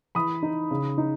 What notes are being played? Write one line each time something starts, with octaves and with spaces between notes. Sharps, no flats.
E3 B5 D#6
D#4
C#3
D#4